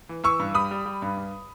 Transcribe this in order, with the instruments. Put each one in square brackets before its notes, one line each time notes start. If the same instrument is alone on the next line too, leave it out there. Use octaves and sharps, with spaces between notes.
[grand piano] E3
E3 C#6 E6
G2
G3 B5 D#6
G3
G3
G2
G2